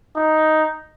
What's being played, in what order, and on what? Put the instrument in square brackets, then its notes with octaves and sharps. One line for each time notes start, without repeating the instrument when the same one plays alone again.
[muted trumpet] D#4